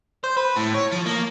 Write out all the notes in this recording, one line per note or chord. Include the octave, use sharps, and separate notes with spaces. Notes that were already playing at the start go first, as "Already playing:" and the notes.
C5
B4
A2
C#5
F3
A#3